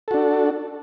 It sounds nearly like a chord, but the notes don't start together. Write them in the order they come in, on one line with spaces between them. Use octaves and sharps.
A4 F#4 D4